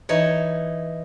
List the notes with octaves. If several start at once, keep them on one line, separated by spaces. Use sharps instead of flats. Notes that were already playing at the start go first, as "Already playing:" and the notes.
E3 D#4 C#5